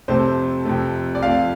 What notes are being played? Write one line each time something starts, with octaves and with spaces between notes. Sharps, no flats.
F2 C3 A3 C5
F2 C3 A3
D5
F2 F3 A3 F5